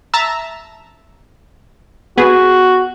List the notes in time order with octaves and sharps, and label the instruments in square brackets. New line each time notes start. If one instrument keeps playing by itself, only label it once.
[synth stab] E5 A5 A#5
[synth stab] B3 G#4 [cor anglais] F#4